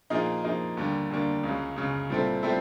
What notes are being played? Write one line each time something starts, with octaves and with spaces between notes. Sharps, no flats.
A#2 F3 A#3 D#4 G#4
A#2 F3 A#3 D#4 G#4
D#2 D3 G3 A#3
D#2 D3 G3 A#3
C#2 C#3 F#3
C#2 C#3 F#3
A#2 G3 C4 E4 A4
A#2 G3 C4 E4 A4